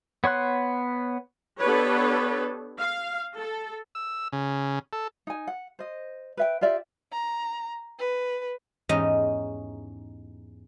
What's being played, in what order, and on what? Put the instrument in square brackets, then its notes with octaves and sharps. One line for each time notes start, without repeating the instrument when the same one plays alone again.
[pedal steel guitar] B3 C#5 C6 F#6
[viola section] B3 D4 G4 A4 B4 C#5
F5
A4
[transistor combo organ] E6
C#3
A4
[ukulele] D#4 G#5
F#5
C5 D#5
B4 E5 G5
F4 G4 D5 E5
[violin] A#5
B4
[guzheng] E2 G#2 C#4 D#4 G4 D#5